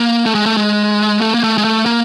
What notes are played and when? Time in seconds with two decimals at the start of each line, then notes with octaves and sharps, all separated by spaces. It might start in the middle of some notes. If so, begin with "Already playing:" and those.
Already playing: A#3
0.26 A3
0.35 G#3
0.46 A3
0.57 G#3
1.21 A3
1.34 A#3
1.43 A3
1.58 G#3
1.64 A3
1.86 A#3